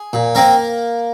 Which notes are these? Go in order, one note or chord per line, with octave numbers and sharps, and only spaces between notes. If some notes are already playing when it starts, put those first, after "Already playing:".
Already playing: G#4
A#2
A#3 C4 A#4